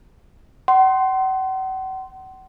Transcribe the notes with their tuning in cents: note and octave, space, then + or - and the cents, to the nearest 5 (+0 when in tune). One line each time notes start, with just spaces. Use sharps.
F#5 +40 C6 +0